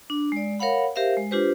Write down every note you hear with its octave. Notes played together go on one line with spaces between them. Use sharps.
D4
G#3 D5
A#4 C#5 F5 F#5 B5
G4 A#4 C5 E5 F5
G#3
D4 F4 G4 B4 C5